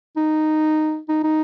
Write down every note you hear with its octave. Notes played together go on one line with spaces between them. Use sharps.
D#4
D#4
D#4